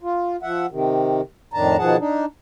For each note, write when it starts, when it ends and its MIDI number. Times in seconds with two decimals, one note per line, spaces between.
0.02 0.36 65
0.43 0.66 53
0.43 0.66 76
0.43 0.66 78
0.70 1.21 48
0.70 1.21 51
1.53 1.77 41
1.53 1.77 45
1.53 1.77 51
1.53 1.77 62
1.53 1.77 81
1.53 1.77 82
1.78 1.96 47
1.78 1.96 51
1.78 1.96 53
1.78 1.96 68
1.78 1.96 78
1.78 1.96 81
1.99 2.25 62
1.99 2.25 63